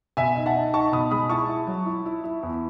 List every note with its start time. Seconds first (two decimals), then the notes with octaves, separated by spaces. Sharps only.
0.17 B2 E5 G#5
0.36 D#4
0.46 F#5 A5
0.55 D#4
0.74 D#4 A5 C#6
0.92 B2 B5 D#6
1.11 G#3 B5 D#6
1.30 E4 A5 C#6
1.49 E4
1.67 F#3
1.86 E4
2.06 E4
2.24 E4
2.43 E2